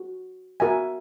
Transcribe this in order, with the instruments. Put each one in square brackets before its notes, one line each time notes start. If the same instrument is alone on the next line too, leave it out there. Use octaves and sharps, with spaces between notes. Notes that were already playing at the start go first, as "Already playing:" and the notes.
Already playing: [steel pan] F#4
F#4 A#4 E5 G#5